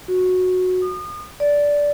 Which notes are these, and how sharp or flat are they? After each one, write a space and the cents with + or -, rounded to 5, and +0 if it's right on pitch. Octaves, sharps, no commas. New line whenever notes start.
F#4 -10
D#6 -35
D5 -10